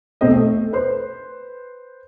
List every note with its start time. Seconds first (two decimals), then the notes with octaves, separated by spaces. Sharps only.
0.21 E1 B1 A3 C4 C5 D#5
0.34 A3
0.73 B4 C5 C6